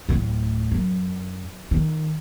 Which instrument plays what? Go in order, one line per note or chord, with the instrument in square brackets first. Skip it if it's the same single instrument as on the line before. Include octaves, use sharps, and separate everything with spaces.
[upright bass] D1 A2
F#2
D#3